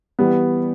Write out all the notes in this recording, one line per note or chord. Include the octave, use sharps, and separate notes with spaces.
E3 G3 B3